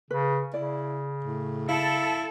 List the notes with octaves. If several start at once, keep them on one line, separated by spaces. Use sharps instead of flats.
C#3 B4
C#3 E4 D5
A2
E4 A4 F5